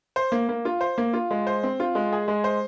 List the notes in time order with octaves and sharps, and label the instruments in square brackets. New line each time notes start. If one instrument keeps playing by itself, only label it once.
[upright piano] C5
A#3
A#3
F4
C5
A#3
F4
G#3
C5
C4
F4
G#3
G#4
G#3
C5